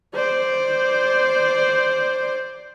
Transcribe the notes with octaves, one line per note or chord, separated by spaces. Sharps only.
C5 D5